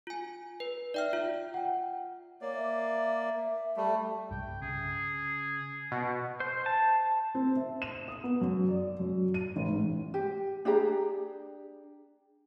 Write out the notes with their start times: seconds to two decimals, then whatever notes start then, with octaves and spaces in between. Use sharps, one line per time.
0.07 F4 G#5
0.60 B4
0.94 D#4 D5 E5 G5 F6
1.13 F4 E5
1.54 F#5 G5
2.42 A#3 C#5 D5
2.55 E5
3.77 G3 A3
4.31 C2 G2 G5
4.62 C#3 G#4
5.92 B2 F#5
6.40 C5
6.66 A5
7.35 C4
7.56 E5
7.82 E7
8.08 D#6
8.24 B3
8.41 F#2
8.69 D5
9.00 F#2
9.34 D#7
9.56 A1
9.67 G#2
10.14 G4
10.65 D4 G4 G#4 A#5